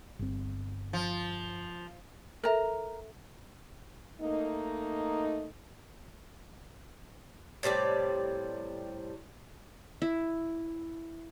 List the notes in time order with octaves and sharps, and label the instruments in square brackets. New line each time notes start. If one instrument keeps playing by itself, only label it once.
[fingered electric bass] G1 C4
[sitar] F3
[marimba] A4 E5 [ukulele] A#4 A#5
[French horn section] A3 A#3 D#4
[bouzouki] A2 C3 G3 D5
[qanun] E4